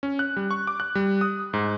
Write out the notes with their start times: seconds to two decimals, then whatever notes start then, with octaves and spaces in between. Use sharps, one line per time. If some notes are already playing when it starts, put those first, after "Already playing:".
0.03 C#4
0.19 F#6
0.37 G3
0.51 C#6
0.67 D6
0.80 F#6
0.95 G3
1.21 D#6
1.53 G#2